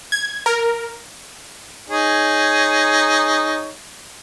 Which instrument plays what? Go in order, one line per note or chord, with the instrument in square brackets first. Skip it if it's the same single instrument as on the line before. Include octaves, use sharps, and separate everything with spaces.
[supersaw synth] G#6
A#4
[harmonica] D#4 G#4 C#5